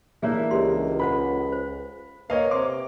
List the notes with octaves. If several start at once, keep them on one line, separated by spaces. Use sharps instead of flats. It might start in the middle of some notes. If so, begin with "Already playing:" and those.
E3 A#3 D4 G#4 A#4 C#5 E5
C#2 G4 C6
A4 C5 F#5 B5
C5
A#3 B4 C#5 D#5 F5
C3 C6 D6